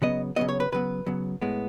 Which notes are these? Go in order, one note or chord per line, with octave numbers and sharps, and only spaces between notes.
C#3 F#3 B3 D#5
C#3 F#3 B3 D#5
C#5
B4
C#3 F#3 B3 B4
C#3 F#3 B3
A2 G#3 B3